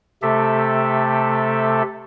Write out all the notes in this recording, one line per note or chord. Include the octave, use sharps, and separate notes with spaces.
C3 A3 G4 A4 E5